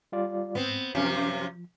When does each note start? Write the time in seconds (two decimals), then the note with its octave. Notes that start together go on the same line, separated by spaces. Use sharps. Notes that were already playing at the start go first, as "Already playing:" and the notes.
0.12 G3 F4 D5
0.55 G#2 B3 C4
0.95 F#2 C3 F3 C#4